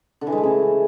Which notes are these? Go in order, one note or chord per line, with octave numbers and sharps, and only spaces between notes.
D3
E3
G#3
A3
C#3